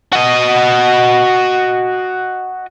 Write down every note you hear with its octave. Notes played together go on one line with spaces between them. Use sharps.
F#4 D#5